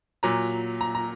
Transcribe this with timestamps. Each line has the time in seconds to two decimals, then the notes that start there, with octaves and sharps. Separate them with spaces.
0.23 A#2 F#3 A#5
0.81 A#5
0.95 A#5